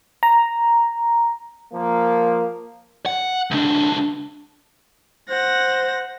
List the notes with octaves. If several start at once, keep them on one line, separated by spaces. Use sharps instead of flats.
A#5
F3 A#3
F#5
C#2 D4
C5 F#5 A#6